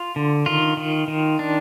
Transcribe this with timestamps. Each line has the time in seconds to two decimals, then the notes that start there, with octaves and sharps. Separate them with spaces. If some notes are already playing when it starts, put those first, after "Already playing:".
Already playing: F4
0.16 D3
0.46 D#3 F4
0.77 D#3
1.08 D#3
1.39 D4